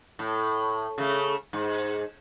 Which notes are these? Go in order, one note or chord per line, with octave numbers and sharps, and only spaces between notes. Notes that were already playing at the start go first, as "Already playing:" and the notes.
A2
C#3 A3
G#2